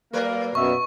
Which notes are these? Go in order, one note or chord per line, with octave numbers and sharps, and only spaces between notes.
F#3 A#3 A#4 B4
F#2 B2 E5 C#6